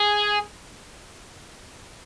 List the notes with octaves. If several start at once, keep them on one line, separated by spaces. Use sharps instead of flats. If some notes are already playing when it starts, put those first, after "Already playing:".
Already playing: G#4